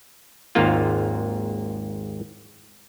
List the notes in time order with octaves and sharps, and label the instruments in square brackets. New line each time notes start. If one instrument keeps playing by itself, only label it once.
[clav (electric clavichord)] G#1 D#2 G#2 A#3 F4